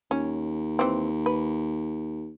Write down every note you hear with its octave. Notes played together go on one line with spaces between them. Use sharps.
D#2 C#4
E3 C4
B4